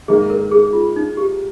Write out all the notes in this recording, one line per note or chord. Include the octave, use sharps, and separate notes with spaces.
G#2 D#3 A#3 G#4
A#4
G#4
F4
D#4
G4